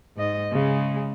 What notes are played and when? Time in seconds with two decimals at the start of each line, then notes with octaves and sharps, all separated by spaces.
0.17 G#2 D#5
0.52 C#3 G#3